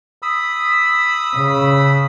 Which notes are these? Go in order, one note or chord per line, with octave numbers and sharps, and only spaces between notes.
B5 D#6 E6
C#3